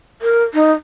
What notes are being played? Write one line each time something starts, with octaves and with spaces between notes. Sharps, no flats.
A#4
D#4